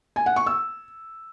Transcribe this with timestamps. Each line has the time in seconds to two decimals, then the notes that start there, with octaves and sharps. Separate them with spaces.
0.16 G#5
0.26 F#5
0.36 C#6
0.46 E6